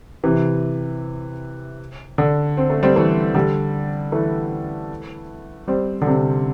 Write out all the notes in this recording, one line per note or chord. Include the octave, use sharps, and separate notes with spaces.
C3 E3
D3
C4
A3
G3 C4
E3 A3
D3 G3
E3 A3
G3 C4
D3
C3